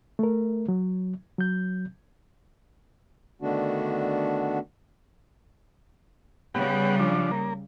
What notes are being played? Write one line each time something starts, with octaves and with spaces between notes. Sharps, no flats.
A3 A#4
F#3
F#3 G6
D3 D#3 A3 B3 D4 F#4
C#3 G3 B3 G4 F#5
F3 D4
A#3